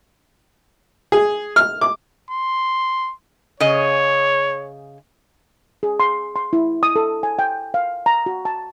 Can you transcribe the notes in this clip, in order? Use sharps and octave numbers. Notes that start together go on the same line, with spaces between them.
G#4
F6
D6
C6
C#3 G#4 C#5 D#5
G#4
C6
C6
E4
D#6
A4
G#5
G5
F5
A#5
F#4
A5